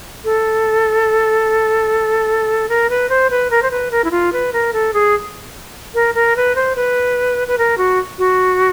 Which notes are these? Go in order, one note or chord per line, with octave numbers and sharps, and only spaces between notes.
A4
A#4
B4
C5
B4
A#4
C5
B4
A#4
E4
F4
B4
A#4
A4
G#4
A#4
A#4
B4
C5
B4
B4
A#4
F#4
F#4